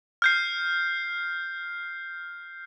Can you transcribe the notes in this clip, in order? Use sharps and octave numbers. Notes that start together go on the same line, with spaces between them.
F6 G6 C7